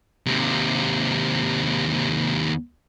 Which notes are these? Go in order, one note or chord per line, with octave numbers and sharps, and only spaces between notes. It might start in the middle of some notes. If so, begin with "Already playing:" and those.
D#2 C3